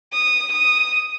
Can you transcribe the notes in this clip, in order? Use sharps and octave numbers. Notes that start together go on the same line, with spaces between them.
D#6
D#6